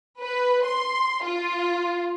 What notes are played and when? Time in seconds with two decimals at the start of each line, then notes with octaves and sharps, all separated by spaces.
0.21 B4
0.66 C6
1.24 F4